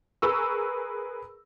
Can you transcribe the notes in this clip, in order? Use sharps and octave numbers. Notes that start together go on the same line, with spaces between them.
G#4 A#4 B4 C#6 E6